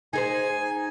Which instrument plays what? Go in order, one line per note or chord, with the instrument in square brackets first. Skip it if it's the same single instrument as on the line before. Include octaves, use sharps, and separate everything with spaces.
[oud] D#4 G#4 C5 [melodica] G#5